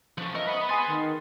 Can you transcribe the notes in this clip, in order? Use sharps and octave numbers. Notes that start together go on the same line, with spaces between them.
F3 A3 C#4 F#6
F3 A#4 D#5 E5 C#6
B4 F#5 B5 D#6
G#4 G#5 C6 A6
D#3